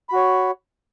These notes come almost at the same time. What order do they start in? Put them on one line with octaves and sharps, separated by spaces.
B5 F#4 C#5